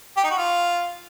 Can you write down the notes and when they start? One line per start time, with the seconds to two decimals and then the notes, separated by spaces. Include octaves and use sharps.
0.17 G4
0.24 D#4
0.30 F#4
0.37 F4